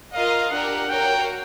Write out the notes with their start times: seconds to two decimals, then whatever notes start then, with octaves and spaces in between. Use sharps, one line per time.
0.13 F4 A#4 D#5 F5
0.51 D4 G4 A#4 F#5
0.89 F#4 A#4 C#5 F5 G5